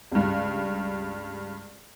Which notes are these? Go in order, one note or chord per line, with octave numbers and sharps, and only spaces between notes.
C#2 G2